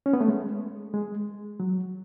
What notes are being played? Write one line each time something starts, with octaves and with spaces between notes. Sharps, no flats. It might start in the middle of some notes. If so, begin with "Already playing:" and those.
C#4
B3
A3
G#3
G#3
F#3